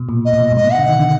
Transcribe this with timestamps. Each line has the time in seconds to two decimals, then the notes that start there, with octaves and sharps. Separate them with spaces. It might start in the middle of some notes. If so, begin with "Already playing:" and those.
Already playing: B2
0.09 A#2
0.25 D#5
0.33 A#2
0.41 B2
0.52 G#2
0.57 A#2 D#5
0.67 B2
0.72 F#5
0.78 D3
0.88 D#3
0.99 D3